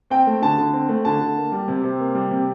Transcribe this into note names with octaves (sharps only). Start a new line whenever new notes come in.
C4 G5
A3
D3 A5
D3
C4
A3
D3 A5
D3
A#3
G3
C3
C3
A#3
G3
C3